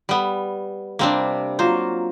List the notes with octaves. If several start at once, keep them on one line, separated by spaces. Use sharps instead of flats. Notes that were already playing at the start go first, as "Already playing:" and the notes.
G3 B3
C3 G3 A#3 C4 D4
F#3 A#3 F4 C5